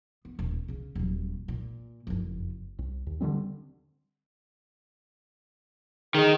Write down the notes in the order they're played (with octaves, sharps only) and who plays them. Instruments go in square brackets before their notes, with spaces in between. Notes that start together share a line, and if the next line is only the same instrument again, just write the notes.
[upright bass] B3
D#1
C#3 C#4
D#1 F#3
A#2
F#1 F2
[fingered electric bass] C2
D#2
D3 E3 G3 C4
[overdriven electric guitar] D#3 D#4 [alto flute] G#4